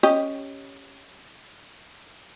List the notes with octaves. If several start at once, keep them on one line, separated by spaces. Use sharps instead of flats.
C#4 G4 D#5